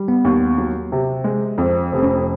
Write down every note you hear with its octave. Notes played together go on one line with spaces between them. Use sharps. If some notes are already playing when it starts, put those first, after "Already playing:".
Already playing: G3
B3
D#2
F#3
C3
G#3
F2 C4
F1
C4
C#4